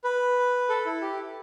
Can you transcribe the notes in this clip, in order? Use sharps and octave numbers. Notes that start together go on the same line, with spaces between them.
B4
A4
E4
G4